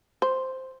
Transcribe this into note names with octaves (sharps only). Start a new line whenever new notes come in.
C5